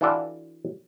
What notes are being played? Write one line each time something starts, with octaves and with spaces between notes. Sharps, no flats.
E3 D4 F4 F#4 A4 D5